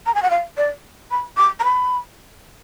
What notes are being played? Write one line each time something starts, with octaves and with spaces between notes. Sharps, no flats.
A#5
G#5
F#5
F5
D5
B5
D6
A#5
B5